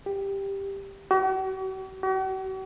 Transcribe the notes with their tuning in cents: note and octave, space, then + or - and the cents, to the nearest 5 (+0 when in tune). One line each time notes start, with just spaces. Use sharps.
G4 +5
F#4 +45
F#4 +45